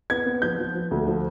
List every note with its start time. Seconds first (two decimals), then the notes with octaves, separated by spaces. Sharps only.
0.10 B3 G#6
0.26 B3
0.42 F3 G6
0.59 F3
0.75 F3
0.91 D2
1.07 F3